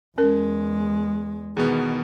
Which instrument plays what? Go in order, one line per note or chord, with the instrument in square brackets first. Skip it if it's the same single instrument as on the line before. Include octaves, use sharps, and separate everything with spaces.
[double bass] E2 G#3 [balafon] C#4 A#4
[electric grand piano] E2 B2 B3 [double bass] D#3 [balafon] G#4